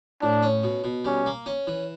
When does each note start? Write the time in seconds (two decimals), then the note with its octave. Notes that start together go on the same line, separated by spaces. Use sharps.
0.22 A2 D4
0.43 C#4
0.63 B2
0.84 B2
1.05 G3 C#4
1.26 A#3
1.46 C#4
1.67 E3